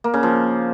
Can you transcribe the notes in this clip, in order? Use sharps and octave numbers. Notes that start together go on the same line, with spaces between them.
A#3
C#3
F3